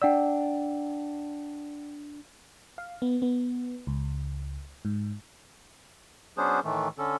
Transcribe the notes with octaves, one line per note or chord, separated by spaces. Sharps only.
D4 D5 F#5 G5 E6
F5
B3
B3
C#2
G#2
F#3 B3 C#4 D4 G#4 C5
A2 D#3 E3 A3
D3 C#4 A4